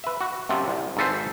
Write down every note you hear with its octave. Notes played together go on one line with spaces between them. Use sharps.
B4 E5
F#4
F#2 C3 F3
C2
G#1 G#2 A4 B4 C5